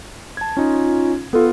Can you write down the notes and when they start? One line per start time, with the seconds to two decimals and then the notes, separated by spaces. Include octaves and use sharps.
0.37 A5 G#6
0.57 C#4 D#4 F4
1.33 B3 F4 A4